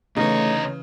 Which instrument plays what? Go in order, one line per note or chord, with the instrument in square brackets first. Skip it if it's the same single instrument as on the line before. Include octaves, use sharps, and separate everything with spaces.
[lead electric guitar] D2 C#5 [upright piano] C#3 E3 [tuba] A3 [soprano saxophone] D#4